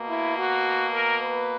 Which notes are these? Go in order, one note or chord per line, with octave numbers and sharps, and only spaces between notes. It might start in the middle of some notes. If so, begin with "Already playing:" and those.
Already playing: B2 A#3
E4
F#4
A#4
B4